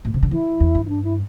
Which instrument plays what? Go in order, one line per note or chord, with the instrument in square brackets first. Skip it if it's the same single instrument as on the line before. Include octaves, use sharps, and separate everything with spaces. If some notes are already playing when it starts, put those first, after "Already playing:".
[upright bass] A2
C3
D3
[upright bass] E3 [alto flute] E4
[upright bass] E2
G2
[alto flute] E4
D4
E4